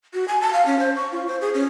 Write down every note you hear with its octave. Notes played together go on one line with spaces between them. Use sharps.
F#4
G#5
A5
F5
C#4
C5
C#6
F4
C5
G#4
C#4